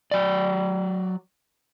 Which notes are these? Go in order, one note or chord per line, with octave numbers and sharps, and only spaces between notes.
F#3 D5